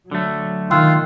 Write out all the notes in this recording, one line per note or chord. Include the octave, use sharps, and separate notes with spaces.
D3 F#3 A3
D#3 F4 G5 E6 F#6